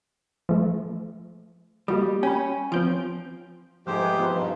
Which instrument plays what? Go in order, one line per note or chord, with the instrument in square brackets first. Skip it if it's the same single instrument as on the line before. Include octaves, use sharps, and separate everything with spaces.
[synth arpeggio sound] F3 A3
[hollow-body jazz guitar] G3 [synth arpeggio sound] A#3 F#4 D#5
[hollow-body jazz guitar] C#4 [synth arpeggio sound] G5 B5
[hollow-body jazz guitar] F3 [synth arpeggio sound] C4 G6 D7
[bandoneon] G#2 G4 C5 [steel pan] F3 A3 G#4
[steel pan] G#4 B4
F3 B3 D#4
[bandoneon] G2 B2